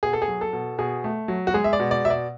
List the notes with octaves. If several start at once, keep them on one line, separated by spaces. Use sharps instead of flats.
B2 G#4
A4
G#4
F#3
A4
B2
B2 G#4
A3
F#3
F#4
G#3 G#4
E5
D5
B2
D5
B2 E5
D5